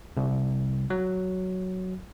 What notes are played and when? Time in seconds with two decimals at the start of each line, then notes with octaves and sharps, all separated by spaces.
0.17 C2
0.90 F#3